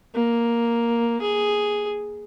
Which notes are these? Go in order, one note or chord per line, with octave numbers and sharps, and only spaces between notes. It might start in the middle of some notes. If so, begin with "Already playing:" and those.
A#3
G#4